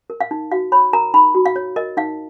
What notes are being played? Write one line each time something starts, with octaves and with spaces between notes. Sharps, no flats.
A#4
F5
D#4
F#4 F5
C#5 B5
A#4 A#5
D#4 B5
F#4
F5
C#5
A#4 D#5
D#4 F5